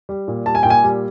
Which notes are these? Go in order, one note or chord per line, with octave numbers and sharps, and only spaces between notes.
G3
A#2
G3 A5
G#5
A#2 G5
G#5
G3